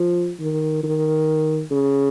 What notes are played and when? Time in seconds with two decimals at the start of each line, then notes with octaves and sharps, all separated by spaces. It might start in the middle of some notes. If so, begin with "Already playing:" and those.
Already playing: F3
0.40 D#3
0.84 D#3
1.71 C#3